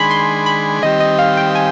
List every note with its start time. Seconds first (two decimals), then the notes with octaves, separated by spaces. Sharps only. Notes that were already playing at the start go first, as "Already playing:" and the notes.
Already playing: D#3 G#3 D4 G#4 G#5 B5 C6
0.11 C6
0.46 B5
0.83 D#3 G3 C4 G4 D#5
1.00 D#5
1.19 F5
1.37 G5
1.55 G#5